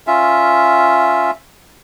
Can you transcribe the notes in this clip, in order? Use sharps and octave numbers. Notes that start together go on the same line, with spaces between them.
C#4 F4 E5